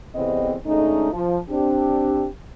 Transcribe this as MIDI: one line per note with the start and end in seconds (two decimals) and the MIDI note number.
0.15 0.54 40
0.15 0.54 45
0.15 0.54 48
0.15 0.54 59
0.15 0.54 60
0.15 0.54 75
0.66 1.12 50
0.66 1.12 56
0.66 1.12 57
0.66 1.12 61
0.66 1.12 63
1.13 1.39 53
1.50 2.27 60
1.50 2.27 62
1.50 2.27 67